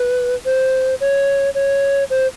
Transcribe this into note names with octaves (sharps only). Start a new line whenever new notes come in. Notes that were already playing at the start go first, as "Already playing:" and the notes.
Already playing: B4
C5
C#5
C#5
C5